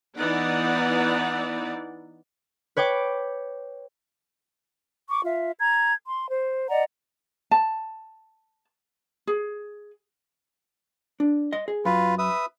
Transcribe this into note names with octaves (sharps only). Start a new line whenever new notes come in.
E3 B3 D#4 D5 F#5
B4 C#5 G5 D6
C#6 D6
F4 E5
A#5 G#6
C6
C5
D5 D#5 F#5 A#5
A5
G#4
D4
D#5 C6
G#4
F#2 F4 B4
B4 E5 D#6